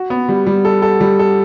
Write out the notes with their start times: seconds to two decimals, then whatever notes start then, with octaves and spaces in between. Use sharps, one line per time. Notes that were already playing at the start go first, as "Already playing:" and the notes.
Already playing: F#4
0.10 B3
0.28 G3
0.46 G3
0.65 A4
0.82 A4
1.00 G3
1.19 A4